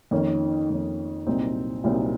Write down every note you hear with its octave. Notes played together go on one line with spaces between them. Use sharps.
F2 D#3 A#3 C#4
F2 D#3 A#3 C#4
C2 A#2 F#3 C4 D#4
C2 A#2 F#3 C4 D#4